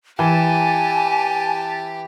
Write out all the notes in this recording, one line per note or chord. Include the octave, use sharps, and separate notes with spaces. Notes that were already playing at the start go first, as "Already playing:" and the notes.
E3 G4 G#5 A5